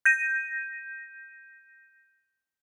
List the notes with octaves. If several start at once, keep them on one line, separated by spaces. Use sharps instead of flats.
G6 A#6 D#7